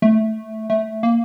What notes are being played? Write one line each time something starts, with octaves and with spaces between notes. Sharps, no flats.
A3
A3
A#3